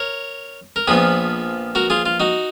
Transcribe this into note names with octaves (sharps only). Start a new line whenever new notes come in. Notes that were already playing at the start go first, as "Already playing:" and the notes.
Already playing: A#4 C#5
A#4
A#1 A#2 F3 B3 G#4 B4
F#4 A#4
F4 G#4
F4
D#4 F#4